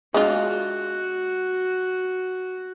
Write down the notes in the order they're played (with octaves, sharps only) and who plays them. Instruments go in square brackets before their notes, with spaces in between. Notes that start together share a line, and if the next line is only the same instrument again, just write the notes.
[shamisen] G#3 D4 F4 [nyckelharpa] F#4